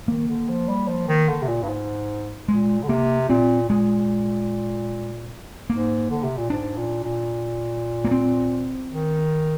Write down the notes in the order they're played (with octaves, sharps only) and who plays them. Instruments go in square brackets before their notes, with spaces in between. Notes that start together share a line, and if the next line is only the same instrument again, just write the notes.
[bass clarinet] D#3 [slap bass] A#3
[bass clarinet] D3
F3
G3
F3
D#3
D3
C3
A#2
G2
G#2
[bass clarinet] A#2 [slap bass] G#3
[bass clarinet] D3
[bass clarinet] C3 [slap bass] A#3
[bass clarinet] A#2 [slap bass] C4
[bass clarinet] A#2 [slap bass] G#3
[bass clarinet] G#2 [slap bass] A#3
[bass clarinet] D3
C3
A#2
[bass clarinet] G#2 [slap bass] D4
[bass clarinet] A#2
A#2
[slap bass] A#3
C4
[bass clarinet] D#3